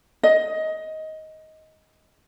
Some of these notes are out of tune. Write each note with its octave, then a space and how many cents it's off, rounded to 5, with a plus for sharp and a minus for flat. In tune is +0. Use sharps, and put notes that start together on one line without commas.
D#5 +15